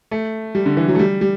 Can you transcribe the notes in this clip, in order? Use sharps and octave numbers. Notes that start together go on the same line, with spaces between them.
A3
G3
D3
E3
F#3
A3
G3
G3